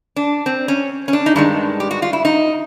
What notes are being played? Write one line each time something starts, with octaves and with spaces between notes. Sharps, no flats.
D4
C4
C#4
C#4
D4
D#4
G2 D#3 G#3 D4
G4
F#4
F4
E4
D#4